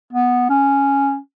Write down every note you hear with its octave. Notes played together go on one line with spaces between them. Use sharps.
B3
C#4